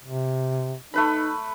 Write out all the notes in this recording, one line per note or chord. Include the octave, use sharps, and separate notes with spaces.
C3
A3 D#4 B4 B5